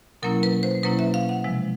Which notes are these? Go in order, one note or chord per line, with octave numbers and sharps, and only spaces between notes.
B2 F#3 A#3 C#4 E4 A#4
B4
C5
B2 F#3 A#3 C#4 E4 B4
E5
F5
F#5
C3 F3 G#3